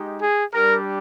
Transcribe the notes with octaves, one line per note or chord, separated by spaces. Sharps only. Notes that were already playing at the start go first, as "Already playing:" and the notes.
Already playing: G#3 D#4 G4
G#4
G3 D4 G4 A#4